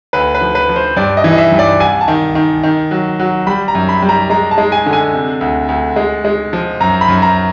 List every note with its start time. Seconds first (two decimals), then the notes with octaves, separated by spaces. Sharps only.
0.13 D2 B4
0.35 B4
0.41 F3
0.55 B4
0.69 F3
0.76 C5
0.96 G2 D5
1.17 D#5
1.24 E3
1.33 D#5
1.38 E5
1.52 G2
1.59 D5
1.80 C2 G#5
2.01 A5
2.08 D#3
2.35 D#3
2.63 D#3
2.91 F#3
3.20 F#3
3.47 G3 B5
3.68 A#5
3.75 F#2
3.89 B5
4.02 G3
4.09 A#5
4.30 G#3 A#5
4.51 A5
4.58 G#3
4.72 G#5
4.86 D3
4.93 G#5
5.13 C3
5.41 D2
5.68 D2
5.96 G#3
6.25 G#3
6.53 F3
6.80 F#2 A#5
7.01 B5
7.08 F#2
7.22 A#5